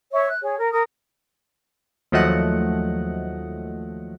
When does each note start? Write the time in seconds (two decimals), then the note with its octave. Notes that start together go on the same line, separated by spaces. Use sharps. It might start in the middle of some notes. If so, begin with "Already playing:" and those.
0.11 C#5 E5 C#6
0.27 F#6
0.41 G#4 C#5
0.57 A#4
0.71 A#4 D#6
2.12 D#2 F3 F#3 A3 D#5 F#5